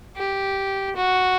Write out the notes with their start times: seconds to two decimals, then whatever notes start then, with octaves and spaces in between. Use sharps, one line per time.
0.17 G4
0.96 F#4